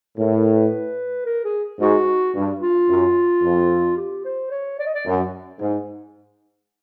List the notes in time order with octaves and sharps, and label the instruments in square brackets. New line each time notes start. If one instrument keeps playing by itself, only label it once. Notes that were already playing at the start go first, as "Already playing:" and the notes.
[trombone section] A2 [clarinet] A#4
[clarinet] A#4
B4
A#4
G#4
[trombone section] G#2 [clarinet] F#4
[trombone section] G2
[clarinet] F4
[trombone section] F#2
F2
[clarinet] G4
C5
C#5
D5
D#5
D5
[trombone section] F#2
G#2